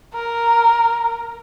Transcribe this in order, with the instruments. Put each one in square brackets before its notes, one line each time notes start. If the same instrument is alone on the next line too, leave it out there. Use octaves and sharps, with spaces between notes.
[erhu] A#4